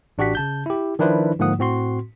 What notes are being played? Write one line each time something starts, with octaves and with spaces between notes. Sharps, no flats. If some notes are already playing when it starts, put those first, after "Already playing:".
A1 D4 F#4 G4 F#5 B6
C#3 A5 G6
E4 G4
D#3 F3 D4 E4 B4 C5
G#2 D3 F3 A#3 F#5 D#6
A2 C4 F#4 C6